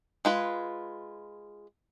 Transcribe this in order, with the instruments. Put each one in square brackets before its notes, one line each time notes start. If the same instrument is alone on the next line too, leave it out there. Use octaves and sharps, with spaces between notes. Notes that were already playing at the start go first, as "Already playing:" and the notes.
[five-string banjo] G#3 F4 B4